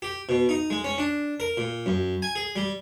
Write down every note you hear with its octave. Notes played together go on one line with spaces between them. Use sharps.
G4
B2
D#4
G#3
C#4
D4
A#4
A#2
F#2
G#5
G#4
G3